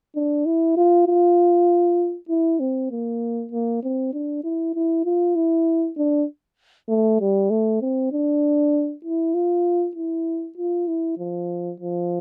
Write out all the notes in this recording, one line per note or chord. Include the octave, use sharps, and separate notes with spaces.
D4
E4
F4
F4
E4
C4
A#3
A#3
C4
D4
E4
E4
F4
E4
D4
A3
G3
A3
C4
D4
E4
F4
E4
F4
E4
F3
F3